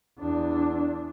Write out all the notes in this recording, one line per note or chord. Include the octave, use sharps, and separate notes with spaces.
E2 D4